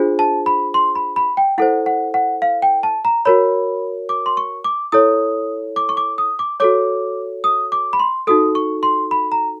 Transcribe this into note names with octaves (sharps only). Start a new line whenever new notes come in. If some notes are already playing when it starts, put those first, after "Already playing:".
Already playing: D4 F4 G#4 C5
A5
B5
C6
B5
B5
G5
E4 A4 C5 F#5
F#5
F#5
F5
G5
A5
A#5
F#4 A#4 C#5 B5
D6
C6
C#6
D6
E4 A4 C#5 D#6
D6
C#6
D6
D#6
D6
F#4 A4 C#5 D6
D#6
D6
B5
C6
D#4 F#4 A4 D#6
C#6
C6
B5
A#5